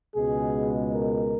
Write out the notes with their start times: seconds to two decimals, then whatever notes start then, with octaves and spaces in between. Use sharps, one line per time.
0.14 C#2 B2 G#3 G#4
0.92 A#4